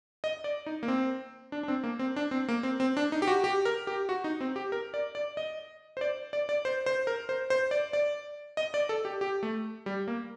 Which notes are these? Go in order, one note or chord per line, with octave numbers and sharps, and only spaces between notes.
D#5
D5
D#4
A#3
C4
D4
D4
C4
A#3
C4
D4
C4
A#3
C4
C4
D4
D#4
G4
F#4
G4
A#4
G4
F#4
D#4
C4
G4
A#4
D5
D5
D#5
C5
D5
D5
D5
C5
C5
A#4
C5
C5
D5
D5
D#5
D5
A4
G4
G4
A3
G3
A#3